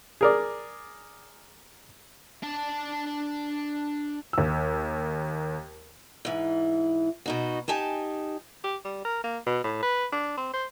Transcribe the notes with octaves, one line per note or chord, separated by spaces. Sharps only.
G#4 A#4 D5
D4 A5
D#2 E6
G#2 E3
B2 D#4 F#4
D#4 G4 G#5 A5
G4
G3
A#4
A#3
B2
A2
B4
D4
C4
C5